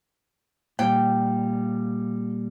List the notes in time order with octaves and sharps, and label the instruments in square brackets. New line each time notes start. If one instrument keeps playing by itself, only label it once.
[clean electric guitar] A#2 G3 [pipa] G5